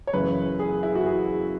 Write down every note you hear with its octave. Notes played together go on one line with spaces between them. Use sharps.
C#5
F#2 C#3 E3 B4
G#4
E4
F#4
G#4